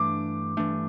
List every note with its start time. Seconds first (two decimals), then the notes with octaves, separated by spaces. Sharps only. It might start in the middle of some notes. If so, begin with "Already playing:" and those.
Already playing: G2 E3 A3 D4 D6
0.57 G2 E3 A3 D4